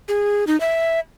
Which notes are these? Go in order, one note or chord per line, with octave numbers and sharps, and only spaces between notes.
G#4
D#4
E5